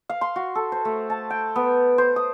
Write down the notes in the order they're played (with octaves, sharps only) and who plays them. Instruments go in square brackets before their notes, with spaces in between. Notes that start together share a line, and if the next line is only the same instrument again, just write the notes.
[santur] F5
C6
F#4
A4
C5
A3
A5
G5
B3
C5
D#6